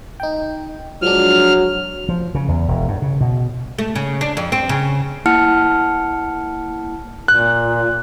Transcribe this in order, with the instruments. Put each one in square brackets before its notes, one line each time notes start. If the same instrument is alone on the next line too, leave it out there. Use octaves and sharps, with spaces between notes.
[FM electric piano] D#4 G5
[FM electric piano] F3 G#3 D4 [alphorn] F#3 [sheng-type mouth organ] F6
[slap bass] F3
C#3
E2
E1
G2
C#3
B2
[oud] A3
C#3
D4
F2
C4
C#3
[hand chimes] A#3 E4 F#5 A5 F6 C#7
[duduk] A#2 [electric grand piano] F#6